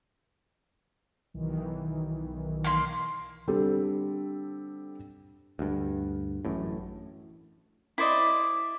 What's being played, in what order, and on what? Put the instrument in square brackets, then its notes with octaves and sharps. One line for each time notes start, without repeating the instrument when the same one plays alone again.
[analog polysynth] B1 D#3 E3
[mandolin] A#3 C6
[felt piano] D3 G3 C4 G4 A4
[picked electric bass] D2 G2
A1 F#2 A2
[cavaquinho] E4 C5 D5 D#5